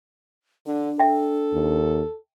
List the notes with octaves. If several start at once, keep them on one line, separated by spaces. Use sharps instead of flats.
D3 D4
A4 E5 G5
D#2